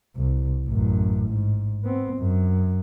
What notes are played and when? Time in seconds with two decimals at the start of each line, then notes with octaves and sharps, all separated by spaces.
0.16 C2
0.67 A1 F#2
1.29 G#2
1.85 B3 C4
2.16 F#2